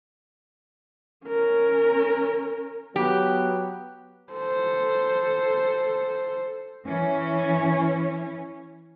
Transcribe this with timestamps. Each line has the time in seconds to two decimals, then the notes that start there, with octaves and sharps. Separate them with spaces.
1.26 C#4 A#4
2.96 F#3 B3 G4
4.32 A4 C5
6.86 E3 C#4